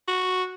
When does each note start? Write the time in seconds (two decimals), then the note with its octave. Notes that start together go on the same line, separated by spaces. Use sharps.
0.08 F#4